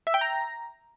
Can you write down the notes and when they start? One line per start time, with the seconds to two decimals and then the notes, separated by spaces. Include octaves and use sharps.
0.07 E5
0.14 G5
0.21 A#5